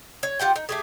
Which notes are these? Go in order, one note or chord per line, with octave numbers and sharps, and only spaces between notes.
C#5
F4 G4 F#5 G5
D#4
A3 G4 G#4